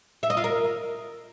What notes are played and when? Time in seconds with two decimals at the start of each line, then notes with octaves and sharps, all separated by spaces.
0.23 E5
0.30 D#5
0.37 F4
0.44 A#4